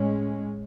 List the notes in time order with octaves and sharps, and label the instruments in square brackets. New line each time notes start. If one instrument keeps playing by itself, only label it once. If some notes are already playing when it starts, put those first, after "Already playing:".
Already playing: [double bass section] A2 G#3 C#4